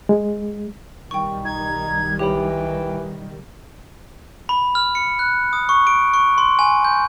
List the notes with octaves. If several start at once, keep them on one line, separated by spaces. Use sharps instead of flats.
G#3
B1 D#3 G3 G5 C#6
D#4 G#6
E3 G4 C#5 G5 B5
B5
F6
C#7
F#6
D#6
C#6
D7
C#6
C6
G#5
G6